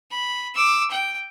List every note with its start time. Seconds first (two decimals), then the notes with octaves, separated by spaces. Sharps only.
0.11 B5
0.55 D6 E6
0.90 G5